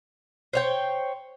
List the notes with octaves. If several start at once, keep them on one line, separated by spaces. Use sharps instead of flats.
C5 C#5 G5